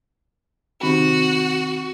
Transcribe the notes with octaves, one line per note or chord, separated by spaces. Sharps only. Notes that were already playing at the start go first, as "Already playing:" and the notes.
C3 D#3 F#4 B5